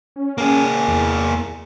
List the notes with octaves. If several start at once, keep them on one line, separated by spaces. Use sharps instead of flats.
C#4
A#3 G#4
E2